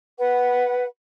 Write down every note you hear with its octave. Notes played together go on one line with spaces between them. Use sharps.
B4 F#5